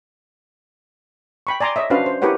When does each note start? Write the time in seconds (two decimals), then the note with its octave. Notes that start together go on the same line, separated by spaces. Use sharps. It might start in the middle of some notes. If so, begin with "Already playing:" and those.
1.47 G5 B5 C#6
1.61 D5 G#5 A#5 C6 D6
1.76 C#5 D#5 E5
1.90 C#4 D4 F#4 B4 C5 F5
2.06 C5
2.22 E4 G4 A#4 B4 C#5 F#5